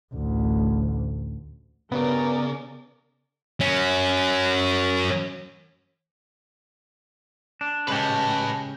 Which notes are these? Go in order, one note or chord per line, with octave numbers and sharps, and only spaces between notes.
A1 D2
G2 C#3 B3 A#4 D5
F#3 C#4
D4
C#3 G#3 G4 B4 A5